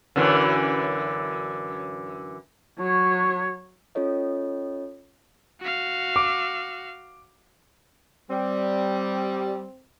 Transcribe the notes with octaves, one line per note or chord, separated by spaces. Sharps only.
F#2 D3 E3
F#3 C#5
C#4 F4 A4 C#5 D#5
F#4 F5
D6
G3 C4